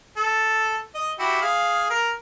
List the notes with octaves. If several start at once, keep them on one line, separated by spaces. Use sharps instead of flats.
A4
D#5
E4 F#4 G4
G#4 F5
A#4